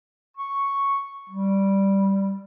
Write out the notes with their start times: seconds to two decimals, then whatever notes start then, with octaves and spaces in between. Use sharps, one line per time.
0.37 C#6
1.29 G3